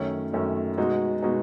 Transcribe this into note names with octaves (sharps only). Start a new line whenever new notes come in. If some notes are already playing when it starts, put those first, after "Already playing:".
Already playing: F#2 D#3 A3 C#4
F#2 D#3 A3 C#4
B2 G#3 D#4 F#4
B2 G#3 D#4 F#4